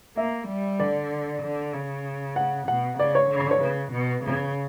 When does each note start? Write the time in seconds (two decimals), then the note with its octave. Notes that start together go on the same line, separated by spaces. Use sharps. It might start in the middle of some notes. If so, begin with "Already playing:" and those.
0.17 A#3 E5
0.48 G3
0.79 D3 D5
1.43 D3
1.74 C#3
2.36 F#5
2.68 B2 F#5
2.98 C#3 D5
3.15 C#5
3.30 D3
3.51 C#5
3.61 C#3 B4
3.92 B2
4.24 C#3